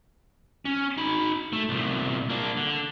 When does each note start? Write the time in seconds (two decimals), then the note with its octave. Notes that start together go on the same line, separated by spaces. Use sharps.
0.65 C#4
0.97 D#4 B5
1.53 A3
1.69 C2 A#2
2.30 A#3 D4
2.57 D3